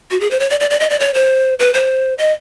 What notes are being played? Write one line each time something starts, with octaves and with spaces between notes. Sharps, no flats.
F#4
G#4
C5
C#5
D5
D5
D5
D#5
D5
C#5
C5
B4
C5
D#5